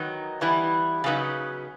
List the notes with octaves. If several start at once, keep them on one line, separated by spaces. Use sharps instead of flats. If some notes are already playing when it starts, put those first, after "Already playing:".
Already playing: D#3 F#3 B3 D#4
E3 G3 B3 E4
C#3 F#3 B3 D#4